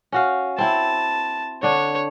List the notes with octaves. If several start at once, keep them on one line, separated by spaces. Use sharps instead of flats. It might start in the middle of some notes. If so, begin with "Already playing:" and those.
C#4 F#4 F5
C4 E4 A5
D3 D4 C#5